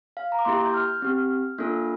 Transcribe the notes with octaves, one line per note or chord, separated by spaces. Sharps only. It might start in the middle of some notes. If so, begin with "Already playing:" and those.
F5
A#5
D6
A#3 E4 G4 C6
G6
F6
C4 G4
A#3 D4 F4 A4